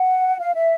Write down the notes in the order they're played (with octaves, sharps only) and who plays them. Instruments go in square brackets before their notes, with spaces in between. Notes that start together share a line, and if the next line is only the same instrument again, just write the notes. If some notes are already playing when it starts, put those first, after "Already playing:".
Already playing: [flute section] F#5
F5
E5